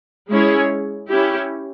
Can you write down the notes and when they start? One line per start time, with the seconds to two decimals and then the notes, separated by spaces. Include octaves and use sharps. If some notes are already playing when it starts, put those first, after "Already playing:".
0.31 G#3 C#4 E4 G#4 C#5
1.09 C#4 E4 G4